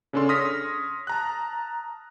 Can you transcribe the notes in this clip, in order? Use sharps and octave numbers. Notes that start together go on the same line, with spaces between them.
C#3 C#4 D4 A4 C6
C#5 C6 D#6 F6 A#6 B6
A5 A#5 F#6